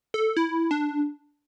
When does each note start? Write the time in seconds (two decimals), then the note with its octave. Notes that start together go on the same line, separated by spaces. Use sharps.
0.14 A4
0.37 E4
0.71 D4